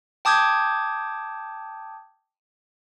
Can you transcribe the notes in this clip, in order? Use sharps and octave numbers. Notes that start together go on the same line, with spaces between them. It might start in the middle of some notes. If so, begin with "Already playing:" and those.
G5 A5 D6 D#6 G6 G#6